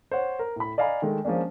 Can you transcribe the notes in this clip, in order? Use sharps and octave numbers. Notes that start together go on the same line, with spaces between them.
C5 C#5 F#5
A#4
A2 B5
D5 D#5 F5 G#5 A#5 B5
D#3 G#3 A3
F3 G#3 A#3 C#4 D4